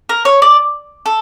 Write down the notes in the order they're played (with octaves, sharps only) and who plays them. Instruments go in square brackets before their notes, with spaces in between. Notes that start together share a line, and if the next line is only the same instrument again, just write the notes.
[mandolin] A#4
C#5
D5
A4